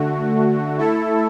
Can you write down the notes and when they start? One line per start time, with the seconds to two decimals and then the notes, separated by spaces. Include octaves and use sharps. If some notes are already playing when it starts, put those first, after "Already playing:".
Already playing: D3 A3 F#4
0.78 A3 E4 A4